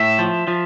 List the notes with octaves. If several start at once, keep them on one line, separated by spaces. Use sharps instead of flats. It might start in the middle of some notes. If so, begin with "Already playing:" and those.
Already playing: A2 E5
F3
F3